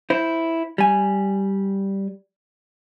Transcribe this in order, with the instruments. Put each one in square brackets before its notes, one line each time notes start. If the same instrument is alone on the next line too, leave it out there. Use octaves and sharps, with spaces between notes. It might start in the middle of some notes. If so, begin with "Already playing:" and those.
[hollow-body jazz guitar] E4 C5
G3 G#5